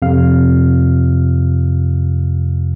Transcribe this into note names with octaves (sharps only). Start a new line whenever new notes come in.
F2 C3 F5 F6